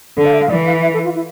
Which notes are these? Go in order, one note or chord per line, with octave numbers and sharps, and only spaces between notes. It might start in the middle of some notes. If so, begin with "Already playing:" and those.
D3 A4
F5
E5
F5
E3 D5
F5
E5
A4
F4
E4